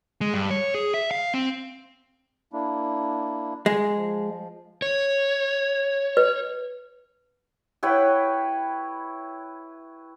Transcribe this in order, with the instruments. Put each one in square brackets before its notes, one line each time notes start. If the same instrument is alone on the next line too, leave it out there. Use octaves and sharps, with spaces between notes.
[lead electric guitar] G#3
G2
C#5
G#4
E5
F5
C4
[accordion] A#3 D4 E4
[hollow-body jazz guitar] G#3
[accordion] F3
[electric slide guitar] C#5
[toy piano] B4
[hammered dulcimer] E4 B4 C#5 G5